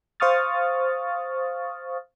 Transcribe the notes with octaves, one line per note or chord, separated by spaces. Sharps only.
C5 F5 C#6 D#6 F6 A6